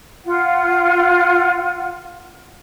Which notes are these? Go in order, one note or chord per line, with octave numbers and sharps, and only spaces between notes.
F4 F#5